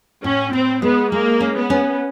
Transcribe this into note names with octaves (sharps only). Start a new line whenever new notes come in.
A2 C#4
A2 C4
G#3 B3
G#3 A#3
C#4
B3
C#4